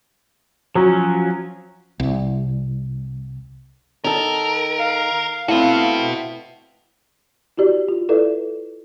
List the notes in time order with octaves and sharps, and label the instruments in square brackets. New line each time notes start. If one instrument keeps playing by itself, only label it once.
[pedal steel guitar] F3 C#4 [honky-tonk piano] F#3
[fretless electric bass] C2
[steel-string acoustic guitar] D#3 A4 [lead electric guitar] A#4
[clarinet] F5
[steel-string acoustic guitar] A3 C4 [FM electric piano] E4 [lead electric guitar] F#4 B4
[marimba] E4 F#4 G4 D5
F4
E4 A4 B4 D5 E5